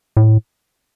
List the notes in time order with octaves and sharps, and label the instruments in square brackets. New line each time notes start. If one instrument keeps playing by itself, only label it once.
[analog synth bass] A2